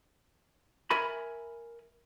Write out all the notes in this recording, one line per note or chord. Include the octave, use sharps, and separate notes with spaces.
A#4 E5 G#5 B5